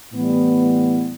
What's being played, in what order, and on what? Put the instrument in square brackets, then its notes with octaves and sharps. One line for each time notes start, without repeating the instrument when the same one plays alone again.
[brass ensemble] A2 E3 G3 B3